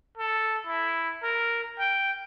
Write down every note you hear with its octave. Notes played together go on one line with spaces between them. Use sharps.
A4
E4
A#4
G5